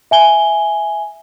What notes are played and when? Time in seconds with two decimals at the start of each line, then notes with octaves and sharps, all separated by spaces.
0.11 E5 G#5 G7